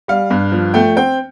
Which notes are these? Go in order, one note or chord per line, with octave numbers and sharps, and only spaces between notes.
G3 F5
G2
F3
A3 G5
C4 G5